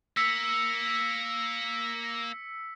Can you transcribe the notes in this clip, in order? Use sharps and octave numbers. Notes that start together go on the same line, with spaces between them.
A#3 A#4 E6 B6 C#7